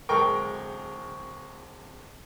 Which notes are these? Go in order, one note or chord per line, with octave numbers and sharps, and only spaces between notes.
D1 G#3 A4 A#4 G5 C#6